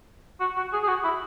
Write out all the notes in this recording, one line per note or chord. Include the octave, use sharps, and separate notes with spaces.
F#4
F#4
G#4
G#4
F#4
E4